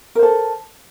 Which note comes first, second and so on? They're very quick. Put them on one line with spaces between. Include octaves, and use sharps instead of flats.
A#4 C5 A4